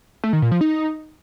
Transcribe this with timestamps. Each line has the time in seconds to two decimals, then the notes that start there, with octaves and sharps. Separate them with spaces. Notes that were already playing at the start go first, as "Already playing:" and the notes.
0.24 A3
0.33 D#3
0.42 A#2
0.52 F3
0.61 D#4